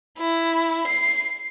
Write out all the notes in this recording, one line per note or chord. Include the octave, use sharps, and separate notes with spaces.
E4
C7